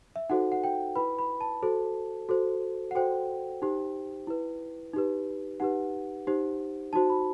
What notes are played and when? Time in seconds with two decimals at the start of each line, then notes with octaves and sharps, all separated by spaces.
0.16 E5
0.30 D#4 F#4 A4 C5 F#5
0.52 F#5
0.64 G5
0.96 E4 B4 B5
1.19 B5
1.41 A5
1.62 F#4 A4 C5
2.29 F#4 A4 C5
2.91 F#5
2.95 F#4 A4 C5 G5
3.62 D#4 G4 C5
4.27 E4 B4
4.94 D#4 G4 B4
5.60 D#4 G4 B4 F#5
6.27 D#4 G4 C5
6.93 D#4 F#4 C5 A5
7.10 B5